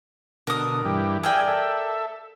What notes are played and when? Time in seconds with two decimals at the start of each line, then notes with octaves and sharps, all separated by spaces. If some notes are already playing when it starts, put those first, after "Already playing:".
0.47 B2 D3 A#4 D#6
0.85 G2 E3 G4
1.23 G#4 A#4 D5 E5 G5 G#5
1.47 A4 E5